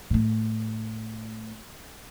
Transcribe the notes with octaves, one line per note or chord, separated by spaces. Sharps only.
A2 A3